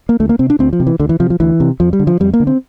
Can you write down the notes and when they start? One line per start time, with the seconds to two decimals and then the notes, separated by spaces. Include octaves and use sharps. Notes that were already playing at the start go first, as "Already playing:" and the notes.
0.09 A#3
0.20 D2 A3
0.29 A#3
0.39 C3 C4
0.50 D4
0.59 D2 C4
0.73 F3
0.80 C3
0.87 E3
0.99 D2 D3
1.09 E3
1.20 C3 F3
1.30 F3
1.40 D2 E3
1.60 C3
1.80 F2 F3
1.93 G3
1.99 D3
2.07 F3
2.20 F2 G3
2.34 A#3
2.40 D3
2.47 C4